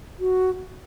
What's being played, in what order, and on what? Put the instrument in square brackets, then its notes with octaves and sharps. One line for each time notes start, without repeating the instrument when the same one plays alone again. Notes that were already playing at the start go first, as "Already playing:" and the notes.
[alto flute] F#4